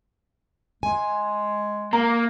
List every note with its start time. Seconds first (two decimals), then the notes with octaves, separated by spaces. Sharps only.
0.83 G#3 G#5
1.93 A#3 A#5